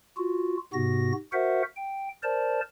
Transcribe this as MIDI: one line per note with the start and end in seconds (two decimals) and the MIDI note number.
0.17 0.57 65
0.17 0.57 66
0.73 1.12 44
0.73 1.12 48
0.73 1.12 59
0.73 1.12 66
0.73 1.12 94
1.33 1.62 66
1.33 1.62 70
1.33 1.62 72
1.33 1.62 76
1.33 1.62 78
1.76 2.08 79
2.23 2.60 70
2.23 2.60 72
2.23 2.60 74
2.23 2.60 81